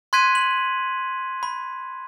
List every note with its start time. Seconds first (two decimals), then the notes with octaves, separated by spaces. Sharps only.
0.13 C6 F#6 G#6 B6 D#7
0.35 F#7
1.43 B5